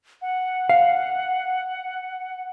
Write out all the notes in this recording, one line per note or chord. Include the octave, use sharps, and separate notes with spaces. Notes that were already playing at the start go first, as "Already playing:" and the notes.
F#5
F5